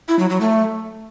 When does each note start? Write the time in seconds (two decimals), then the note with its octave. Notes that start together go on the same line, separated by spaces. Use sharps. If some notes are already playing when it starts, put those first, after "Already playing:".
0.08 E4
0.19 F#3
0.30 F#3
0.41 A3